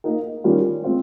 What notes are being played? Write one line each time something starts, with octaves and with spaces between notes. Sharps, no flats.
A#3 D#4 A#4
D#3 G3 C#4 F4 A#4
G#3 C4 F4 G#4 C5